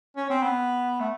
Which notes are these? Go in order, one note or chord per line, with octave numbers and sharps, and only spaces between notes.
C#4
C4
B3
A3